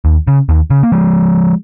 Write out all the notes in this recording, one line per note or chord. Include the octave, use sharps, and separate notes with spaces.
D#2
C#3
D#2
C#3
A#3
F3 G#3